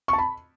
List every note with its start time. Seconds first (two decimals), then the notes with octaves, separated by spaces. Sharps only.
0.08 C#6
0.13 A5
0.18 B5